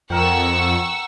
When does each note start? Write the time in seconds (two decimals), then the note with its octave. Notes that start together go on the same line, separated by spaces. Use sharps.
0.10 F2 A#4 F#5 G5 C#6 E6